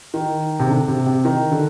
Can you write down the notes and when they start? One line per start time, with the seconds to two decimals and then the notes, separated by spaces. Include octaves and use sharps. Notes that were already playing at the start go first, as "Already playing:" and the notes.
0.14 D#3
0.60 C3
0.69 D3
0.88 C3
1.06 C3
1.25 D#3
1.52 D3